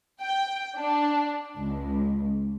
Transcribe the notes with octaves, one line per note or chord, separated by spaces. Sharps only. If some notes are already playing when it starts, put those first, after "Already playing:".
G5
D4
C#2